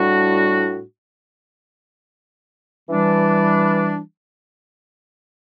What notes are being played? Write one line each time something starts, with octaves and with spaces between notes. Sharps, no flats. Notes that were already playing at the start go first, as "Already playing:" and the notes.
Already playing: A2 G3 D4 F#4
E3 G3 D4